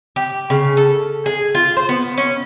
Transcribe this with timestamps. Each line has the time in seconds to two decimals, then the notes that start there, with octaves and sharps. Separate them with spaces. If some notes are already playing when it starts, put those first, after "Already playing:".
0.16 G4
0.50 C#3
0.77 A4
1.26 G#4
1.55 F4
1.77 C5
1.89 B3
2.17 C#4